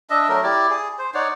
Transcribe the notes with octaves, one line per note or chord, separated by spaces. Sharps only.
D4 D#5 E5
F#3 A3 A#4
E4 G4 D5
G#4
C5
D#4 C#5 D5 F#5